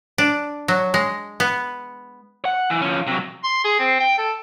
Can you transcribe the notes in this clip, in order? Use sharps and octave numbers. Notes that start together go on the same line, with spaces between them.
D4
F#3
G#3
B3
F#5
E3
F3 C#4
C3 F#3
C6
G#4
C4
G5
A4